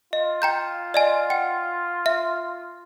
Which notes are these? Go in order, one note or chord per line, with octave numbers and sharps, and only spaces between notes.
F4 D#5
G5 A#5 G6
D5 D#5 G#5
F#5 G5
E5